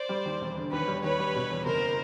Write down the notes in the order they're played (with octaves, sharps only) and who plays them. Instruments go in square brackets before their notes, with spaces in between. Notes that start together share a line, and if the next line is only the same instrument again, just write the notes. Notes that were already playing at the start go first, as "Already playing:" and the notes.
Already playing: [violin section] C5 D5
[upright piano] G3
D#2
E1
D3
[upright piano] D#2 [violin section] B4 C#5
[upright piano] G3
[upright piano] D#2 [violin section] B4 C#5
[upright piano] G3
B2
E2
[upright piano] F#1 [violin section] A#4 C5